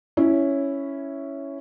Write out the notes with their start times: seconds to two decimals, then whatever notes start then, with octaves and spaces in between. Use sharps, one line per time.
0.17 C#4 E4 C#5